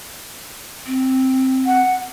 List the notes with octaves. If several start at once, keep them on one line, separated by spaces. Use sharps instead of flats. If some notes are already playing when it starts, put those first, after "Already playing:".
C4
F#5